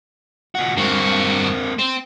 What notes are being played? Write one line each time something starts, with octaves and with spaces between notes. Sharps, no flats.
A#2 F#4
G2 A#3 C4 F#4
C4